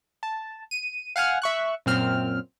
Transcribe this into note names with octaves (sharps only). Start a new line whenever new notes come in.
A5
D#7
F5 F#5 G#5 F6
E5 C#6 F#6
F#2 A#2 C4 F6